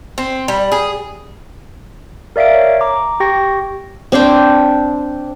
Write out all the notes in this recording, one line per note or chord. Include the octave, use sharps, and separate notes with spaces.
C4
G3
G#4
A#4 D5 E5 F5 D7
C#5
A#5 D6
G4 G5 C#6 A#6
C4 D4 C5 G5